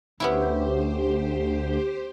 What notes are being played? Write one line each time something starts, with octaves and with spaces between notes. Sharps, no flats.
D2 B3 C#4 E4 G4 C5